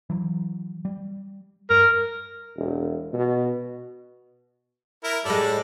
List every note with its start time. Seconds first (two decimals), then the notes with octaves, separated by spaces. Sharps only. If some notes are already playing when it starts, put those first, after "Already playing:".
0.10 E3 F#3
0.85 G3
1.70 G2 A#4
2.57 E1
3.13 B2
5.04 E4 A#4
5.25 A2 G3 G#3 A4 D5